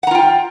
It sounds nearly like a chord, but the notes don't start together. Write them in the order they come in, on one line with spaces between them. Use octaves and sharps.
F#5 A#5 F4 G5